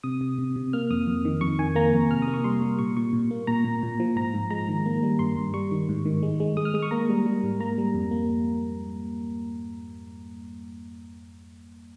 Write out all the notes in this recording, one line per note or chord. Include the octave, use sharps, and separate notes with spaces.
C3 D#6
C3
C3
C3
A#3 F6
F2 D#6
F2
D#3
F2 C#6
D#3 G#5
A#3 A#5
F2
C3 F6
D#6
A#3
C#6
G3 C6
G3
A#2 C#6
A#2 C#6
A#2
A#3
A#2 A#5
A#2
A#2
F3
G#2 A#5
G#2
G#3 A#5
D#3
A#3
G3
G2 C6
G2
G3 C#6
D#3
G#2
D#3
G#3
G#3
G#3 D#6
F6
G#3 D#6
C#6
A#3 A#5
G3
G3
G#2
A#3 A#5
G3
F2
A#3